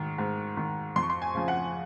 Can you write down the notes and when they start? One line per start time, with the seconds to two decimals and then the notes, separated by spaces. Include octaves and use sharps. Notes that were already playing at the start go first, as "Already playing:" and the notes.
Already playing: G#2 D#3
0.18 G#2
0.57 D#3
0.96 F2 C6
1.03 C#6
1.10 C6
1.22 G#5
1.34 C#3 F3
1.48 F#5